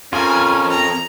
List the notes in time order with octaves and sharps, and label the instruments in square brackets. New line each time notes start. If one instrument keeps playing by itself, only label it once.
[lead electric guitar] F2 [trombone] C#4 [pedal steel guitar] F4 G#4 A#4 [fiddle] G#5
[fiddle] A#5